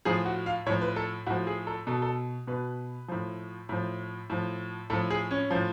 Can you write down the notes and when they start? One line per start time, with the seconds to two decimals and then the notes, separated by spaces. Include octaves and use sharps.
0.05 A2 F3 G#4
0.25 F#4
0.46 F5
0.66 A2 C#5
0.70 F3
0.81 B4
0.96 A4
1.27 A2 F3 F#4
1.47 G#4
1.67 A4
1.87 B2 A4
2.02 A4
2.47 B2 B4
3.08 A2 F3
3.69 A2 F3
4.30 A2 F3
4.90 A2 F3 A4
5.10 G#4
5.31 C#4
5.51 A2 F3